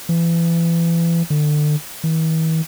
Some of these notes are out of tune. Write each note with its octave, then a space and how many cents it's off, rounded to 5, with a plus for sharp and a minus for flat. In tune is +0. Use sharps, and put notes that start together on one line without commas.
E3 +30
D3 +30
E3 -45